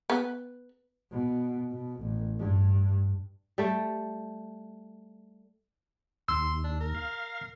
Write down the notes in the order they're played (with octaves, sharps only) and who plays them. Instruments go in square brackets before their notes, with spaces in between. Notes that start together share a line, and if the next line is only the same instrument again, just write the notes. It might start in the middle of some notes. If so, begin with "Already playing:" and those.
[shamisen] B3
[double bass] B2
B2
A1
G2
[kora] G3 A3
[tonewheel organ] D#2 [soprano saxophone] C6 [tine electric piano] E6
[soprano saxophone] D4
A#4
[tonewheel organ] F5